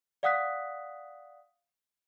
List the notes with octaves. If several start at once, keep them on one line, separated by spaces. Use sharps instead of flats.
D5 F5 F#5 D#6 F#6 B6